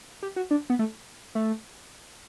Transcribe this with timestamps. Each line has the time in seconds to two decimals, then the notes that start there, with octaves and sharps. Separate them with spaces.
0.23 G4
0.36 F#4
0.51 D4
0.70 B3
0.79 A3
1.35 A3